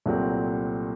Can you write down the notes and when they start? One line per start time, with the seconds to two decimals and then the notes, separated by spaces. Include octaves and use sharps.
0.06 C2 A#2 F#3 A3 C4